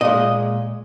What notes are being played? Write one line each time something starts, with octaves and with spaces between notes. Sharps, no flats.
A#2 G#3 D#5